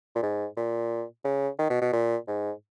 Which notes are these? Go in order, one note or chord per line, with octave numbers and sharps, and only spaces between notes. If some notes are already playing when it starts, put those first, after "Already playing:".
A#2
G#2
A#2
C#3
D#3
B2
B2
A#2
G#2